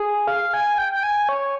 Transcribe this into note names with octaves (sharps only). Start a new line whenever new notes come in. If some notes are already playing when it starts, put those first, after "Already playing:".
Already playing: G#4
F5
G#5
G5
G5
G#5
C#5